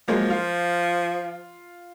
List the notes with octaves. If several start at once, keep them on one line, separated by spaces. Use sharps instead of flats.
F3 F#3 G#3 A#3
F4